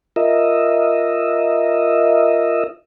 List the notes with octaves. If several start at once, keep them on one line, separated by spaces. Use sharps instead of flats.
F4 A#4 D#5 E5